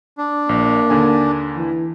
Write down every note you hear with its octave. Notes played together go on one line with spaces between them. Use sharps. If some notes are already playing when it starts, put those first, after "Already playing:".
D4
A#1 A#3
D#2 D3 G#5
E3